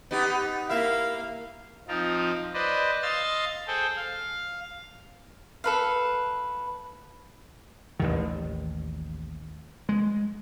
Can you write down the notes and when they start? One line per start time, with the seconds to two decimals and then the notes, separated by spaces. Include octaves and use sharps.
0.11 B3 D#4 G4
0.69 A#3 E4 E5 F5
1.88 F3 C4 D#4 F4
2.54 B4 C5 D5 D#5
3.02 D#5 F5 C6 E6 A6
3.67 G#4 A4 C5 G5
3.97 F5
5.64 A4 B4 F5
8.00 A1 D#2 D#3
9.89 G#3